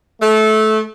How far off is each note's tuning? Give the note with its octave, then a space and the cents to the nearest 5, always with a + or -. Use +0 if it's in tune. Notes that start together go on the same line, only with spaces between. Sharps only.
A3 -20